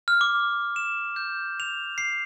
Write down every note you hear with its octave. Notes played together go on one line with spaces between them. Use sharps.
F6
D6
E7
G6
F7
C7